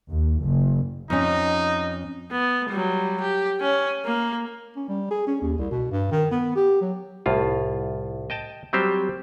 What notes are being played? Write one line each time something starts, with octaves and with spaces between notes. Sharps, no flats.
D#2
F#1
F2 C#4 D#4
B3
F#3 G3
G4
C#4
A#3
C#4
G3
G#4
C#4
D#2
C2
B2
G2
D#3
B3
G4
F#3
C2 A2 F4
D#5 G5 A5
F#3 G3 C4 G4 C5